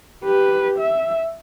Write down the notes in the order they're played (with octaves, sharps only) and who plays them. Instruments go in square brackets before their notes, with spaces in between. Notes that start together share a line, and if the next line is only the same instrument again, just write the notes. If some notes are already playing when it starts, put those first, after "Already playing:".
[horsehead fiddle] G4 B4
E5